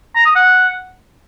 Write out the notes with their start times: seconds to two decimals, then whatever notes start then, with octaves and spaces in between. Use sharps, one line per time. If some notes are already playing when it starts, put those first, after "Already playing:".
0.15 A#5
0.25 D#6
0.35 F#5